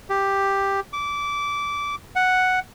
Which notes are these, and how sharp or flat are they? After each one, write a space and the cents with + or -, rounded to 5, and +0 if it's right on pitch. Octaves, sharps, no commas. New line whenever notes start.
G4 +5
D6 -20
F#5 +0